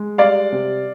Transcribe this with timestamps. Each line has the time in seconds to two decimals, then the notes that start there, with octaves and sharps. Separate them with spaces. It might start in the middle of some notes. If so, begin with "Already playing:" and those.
Already playing: G#3
0.18 G3 D5 F5
0.52 C3